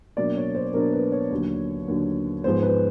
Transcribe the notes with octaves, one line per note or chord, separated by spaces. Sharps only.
B2 F#3 A#3 D4 D5
C#5
C5
B2 F#3 A#3 D4 A#4
B4
C#5
D#2 D3 F#3
D#2 D3 F#3
G#2 F3 G#3 B3 C5
B4